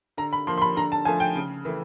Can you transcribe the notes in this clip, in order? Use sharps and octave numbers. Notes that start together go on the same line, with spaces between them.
D3 A#5
B5
F3 A#3 C6
C6
B5
D3 A#5
A5
F3 A3 G#5
G5
C#3
E3 A3